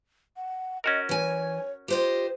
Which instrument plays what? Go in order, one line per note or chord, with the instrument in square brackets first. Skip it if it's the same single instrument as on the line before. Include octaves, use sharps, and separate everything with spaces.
[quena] F#5
[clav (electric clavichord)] C#4 F#4 A#4 [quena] D#5
[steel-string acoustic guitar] E3 G#5 [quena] C#5
[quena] F4 [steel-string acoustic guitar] G4 C5 D#5